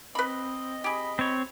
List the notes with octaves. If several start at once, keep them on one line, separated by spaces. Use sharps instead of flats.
C4 B4 D#5 B5
G4 G#4 B5
C4 C#5